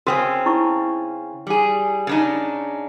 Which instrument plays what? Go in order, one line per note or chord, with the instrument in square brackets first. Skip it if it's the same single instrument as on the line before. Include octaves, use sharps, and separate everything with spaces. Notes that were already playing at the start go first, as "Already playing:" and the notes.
[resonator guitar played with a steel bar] C#3 C4 C#4 [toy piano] F#4 E6
[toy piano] D#4 E4 C#6
[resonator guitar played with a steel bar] G3 G#4
C#3 D4 D#4